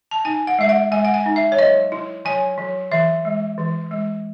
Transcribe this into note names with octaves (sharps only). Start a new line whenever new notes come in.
A5
D#4 G#5
F#5
G#3 E5
F#5
G#3 G#5
F#5
G#5
D#4
E5
C#5
F#3 D#5
E4
F#3 G#5
F#3
E3 E5
G#3
E3
G#3